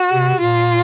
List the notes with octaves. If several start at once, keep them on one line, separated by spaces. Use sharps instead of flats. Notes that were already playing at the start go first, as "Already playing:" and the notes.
Already playing: F#4
C3
A#2 F4